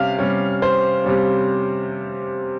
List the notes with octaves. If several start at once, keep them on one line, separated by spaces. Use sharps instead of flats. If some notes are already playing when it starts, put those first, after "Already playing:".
Already playing: C3 G3 C#4 F5
C3 G3 C#4
C5
C3 G3 C#4